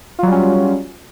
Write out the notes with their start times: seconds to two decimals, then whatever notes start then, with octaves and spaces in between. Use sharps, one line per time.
0.19 F4
0.23 F#3
0.27 G3
0.32 C#4